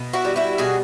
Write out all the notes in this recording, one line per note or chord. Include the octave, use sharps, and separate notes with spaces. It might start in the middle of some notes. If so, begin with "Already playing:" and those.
Already playing: B2
E4 F#4
G3
E4 F#4
B2 F#4 G#4